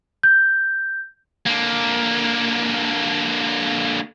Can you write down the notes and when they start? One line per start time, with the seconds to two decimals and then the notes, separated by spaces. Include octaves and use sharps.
0.23 G6
1.46 D3 A#3